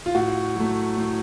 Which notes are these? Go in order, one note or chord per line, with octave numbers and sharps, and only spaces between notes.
F4
A2 F#4
F#3 A3
A2